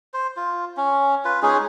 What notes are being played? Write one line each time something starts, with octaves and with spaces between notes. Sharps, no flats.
C5
F4
C#4
F4 B4
G#3 C#4 D#4 G#4